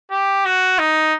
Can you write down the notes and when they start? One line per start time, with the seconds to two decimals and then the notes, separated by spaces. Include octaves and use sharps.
0.11 G4
0.46 F#4
0.79 D#4